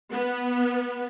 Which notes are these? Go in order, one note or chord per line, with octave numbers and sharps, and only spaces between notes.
B3